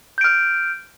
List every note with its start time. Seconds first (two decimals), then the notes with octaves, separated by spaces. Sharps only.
0.18 G6
0.21 D7
0.24 F6